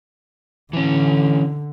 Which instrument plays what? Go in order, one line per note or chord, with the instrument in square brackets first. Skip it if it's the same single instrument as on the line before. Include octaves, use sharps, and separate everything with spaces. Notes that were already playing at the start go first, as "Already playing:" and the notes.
[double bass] D3 [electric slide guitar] E3 C#4